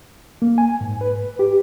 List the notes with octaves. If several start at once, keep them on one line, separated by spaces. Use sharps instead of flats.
A#3
G#5
G#2
B4
G4